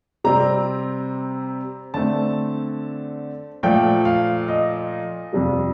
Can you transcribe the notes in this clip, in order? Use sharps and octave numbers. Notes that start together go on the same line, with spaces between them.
C3 G3 C4 A#5
D3 A3 C4 A5
A#2 F3 A3 G5
F5
D#5
F2 C3 G3